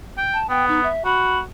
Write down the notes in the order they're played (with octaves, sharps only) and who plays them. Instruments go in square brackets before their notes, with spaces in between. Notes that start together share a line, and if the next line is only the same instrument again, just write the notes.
[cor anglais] G5
[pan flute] A5
[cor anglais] B3 [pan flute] G5
[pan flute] D#4
E5
[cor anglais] F#4 [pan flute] B5